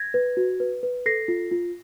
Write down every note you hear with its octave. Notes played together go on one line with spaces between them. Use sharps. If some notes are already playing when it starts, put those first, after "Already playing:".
Already playing: G#6 A#6
B4
F#4
B4
B4
A4 A#6 C7
F4
F4